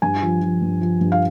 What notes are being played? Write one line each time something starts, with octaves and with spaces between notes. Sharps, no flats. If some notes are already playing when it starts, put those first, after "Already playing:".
G2 G#5
F3
F3
G2
F3
G2
F5